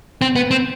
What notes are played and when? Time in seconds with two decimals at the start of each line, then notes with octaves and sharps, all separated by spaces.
0.21 C4
0.36 B3
0.51 C4